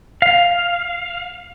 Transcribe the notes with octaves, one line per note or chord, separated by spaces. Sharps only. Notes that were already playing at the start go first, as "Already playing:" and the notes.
F5